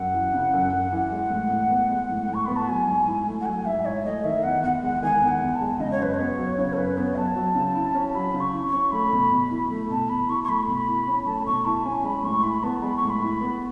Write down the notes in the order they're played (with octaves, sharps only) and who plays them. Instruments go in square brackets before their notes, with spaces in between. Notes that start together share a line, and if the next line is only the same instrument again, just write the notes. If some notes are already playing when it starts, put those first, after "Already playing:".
Already playing: [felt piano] F#2 [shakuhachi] F#5
[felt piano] E3
C#3
F#2
F#2
E3
G#3
A2
A2
B3
G#3
A2
A2
[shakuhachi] C#6
[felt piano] B3 [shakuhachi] B5
[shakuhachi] A5
[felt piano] F#3 [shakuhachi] G#5
[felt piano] G#2
E4
A3
[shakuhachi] F#5
[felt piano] F#3 [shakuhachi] G#5
[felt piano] G#2 [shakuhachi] E5
[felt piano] E4 [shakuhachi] C#5
[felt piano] A3 [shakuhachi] D#5
[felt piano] D#3 [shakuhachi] E5
[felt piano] E2 [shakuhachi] F#5
[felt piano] E2 [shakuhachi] F#5
[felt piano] G#3 [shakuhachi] F#5
[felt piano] D#3 [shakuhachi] G#5
[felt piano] E2
[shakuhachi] F#5
[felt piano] E2
[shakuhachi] A5
[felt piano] G#3
[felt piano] C#3 [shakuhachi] D#5
[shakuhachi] C#5
[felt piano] F#2 [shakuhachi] B4
[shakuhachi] C#5
[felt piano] B3
F#3
[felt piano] C#3 [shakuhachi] C#5
[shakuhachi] A4
[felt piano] F#2 [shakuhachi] B4
[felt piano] B3 [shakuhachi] C#5
[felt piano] F#3 [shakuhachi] A5
[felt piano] F#3
C#3
E4
C#4
[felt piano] F#3 [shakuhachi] B5
[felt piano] C#3
[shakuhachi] C#6
[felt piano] E4
[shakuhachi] C#6
[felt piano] C#4
[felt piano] A3 [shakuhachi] B5
[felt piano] B2
B2
E4
A3
[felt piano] B2 [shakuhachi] A5
[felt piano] B2 [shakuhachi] B5
[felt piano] E4 [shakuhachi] C#6
[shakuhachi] C#6
[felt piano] A3 [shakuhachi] B5
[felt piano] B2
E4
C#4
[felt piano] A3 [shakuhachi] A5
[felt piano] B2 [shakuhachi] C#6
[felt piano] E4 [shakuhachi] A5
[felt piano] C#4 [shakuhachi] G#5
[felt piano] G#3 [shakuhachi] B5
[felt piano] A2 [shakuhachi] C#6
[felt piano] E4 [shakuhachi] B5
[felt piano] B3 [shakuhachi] A5
[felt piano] G#3 [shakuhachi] B5
[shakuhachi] C#6
[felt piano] A2
[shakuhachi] B5
[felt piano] E4
B3